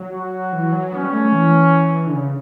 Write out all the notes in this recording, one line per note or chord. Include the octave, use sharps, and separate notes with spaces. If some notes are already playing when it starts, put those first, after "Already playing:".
Already playing: F#3
F#4
E3
F#3
B3 C#4
G3
A3
E3
D3
C#3